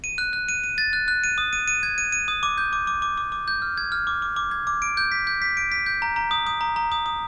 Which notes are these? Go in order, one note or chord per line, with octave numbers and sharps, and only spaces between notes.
D#7
F#6
F#6
D#7
D#7
A6
F#6
F#6
D#7
D#6
D#7
D#7
G#6
D#7
D#7
D#6
D6
G6
D6
D6
D6
D6
D6
G6
F6
G#6
F6
D6
D6
D6
G#6
D6
D7
G6
B6
G6
B6
D7
B6
G6
A#5
A#5
D#6
D#6
A#5
A#5
D#6
D#6